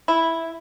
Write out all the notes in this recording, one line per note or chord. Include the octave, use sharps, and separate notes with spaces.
E4